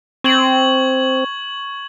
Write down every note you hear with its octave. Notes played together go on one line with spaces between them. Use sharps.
C4 C#6 G#6 F#7